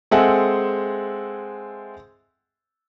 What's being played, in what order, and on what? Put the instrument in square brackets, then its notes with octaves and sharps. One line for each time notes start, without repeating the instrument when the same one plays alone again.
[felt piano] G#3 C4 A4 E5 F#5 G#5